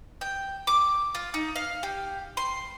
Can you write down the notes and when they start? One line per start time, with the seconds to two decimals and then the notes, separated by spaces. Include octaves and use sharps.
0.21 G5
0.67 D6
1.15 F4
1.34 D#4
1.56 F5
1.83 G4
2.37 C6